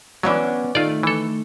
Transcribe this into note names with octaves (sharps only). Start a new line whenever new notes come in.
E3 F#3 B3 C#4 D4
D#3 A3 F4 D5
E3 A4